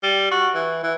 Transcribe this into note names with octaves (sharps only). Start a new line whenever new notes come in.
G3
F#4
E3
E3